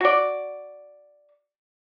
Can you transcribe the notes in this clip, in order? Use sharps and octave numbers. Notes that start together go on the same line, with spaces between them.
F#4 D5